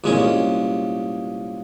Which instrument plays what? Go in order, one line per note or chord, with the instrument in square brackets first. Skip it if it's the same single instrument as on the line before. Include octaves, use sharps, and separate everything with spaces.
[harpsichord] C2 A#2 G#3 C#4 G#4